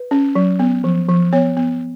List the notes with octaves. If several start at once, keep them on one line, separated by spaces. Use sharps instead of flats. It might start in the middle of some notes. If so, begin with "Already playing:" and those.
Already playing: B4
C#4
F#3
B3
F3
F3
B3 C#5
B3